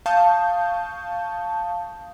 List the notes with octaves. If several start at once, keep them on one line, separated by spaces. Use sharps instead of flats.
F5 A5 C#6 D#6 G6